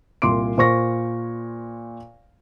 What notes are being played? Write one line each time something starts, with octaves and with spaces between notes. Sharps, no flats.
C2 A#2 C6 D6 D7
A#2 C5 C#6 A#6